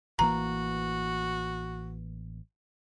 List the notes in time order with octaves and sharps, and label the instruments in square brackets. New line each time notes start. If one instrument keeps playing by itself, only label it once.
[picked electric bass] A1 E3 A#3 [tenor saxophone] F#4 [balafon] A#5